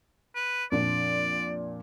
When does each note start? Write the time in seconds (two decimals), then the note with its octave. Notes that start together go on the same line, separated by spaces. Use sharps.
0.35 B4
0.72 F2 A#2 D4 D5